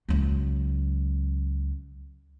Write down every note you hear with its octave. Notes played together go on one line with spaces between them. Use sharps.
C#2 F#3